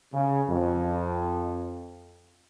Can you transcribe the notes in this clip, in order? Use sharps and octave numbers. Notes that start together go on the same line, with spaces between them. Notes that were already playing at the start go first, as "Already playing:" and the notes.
C#3
F2